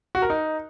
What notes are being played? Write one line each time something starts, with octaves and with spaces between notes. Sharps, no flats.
F#4
A#4
D#4